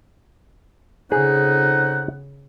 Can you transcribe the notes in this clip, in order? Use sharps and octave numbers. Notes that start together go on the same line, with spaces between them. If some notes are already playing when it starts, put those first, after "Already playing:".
F2 C#3 D#4 G#4 F#5